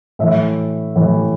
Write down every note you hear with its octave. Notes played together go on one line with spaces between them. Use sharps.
A2 E3 E5
A2 E3